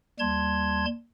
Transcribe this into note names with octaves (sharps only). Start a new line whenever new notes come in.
D#2 G3 A5 C6 G#6